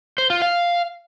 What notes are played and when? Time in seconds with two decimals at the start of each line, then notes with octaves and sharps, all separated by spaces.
0.18 C5
0.30 F4
0.42 F5